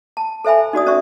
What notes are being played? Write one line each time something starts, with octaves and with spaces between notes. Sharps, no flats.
A5
A4 C5 E5 G#5 B5
D#4 F#4 D5 D#6
C#4 C5 D5 E5 C#6